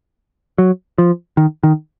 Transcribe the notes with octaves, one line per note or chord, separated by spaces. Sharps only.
F#3
F3
D#3
D#3